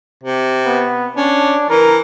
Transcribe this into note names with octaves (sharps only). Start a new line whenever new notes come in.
C3
B3
C#4 D4
E3 A#4